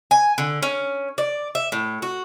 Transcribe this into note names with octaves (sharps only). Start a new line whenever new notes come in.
G#5
D3
C#4
D5
E5
A2
F#4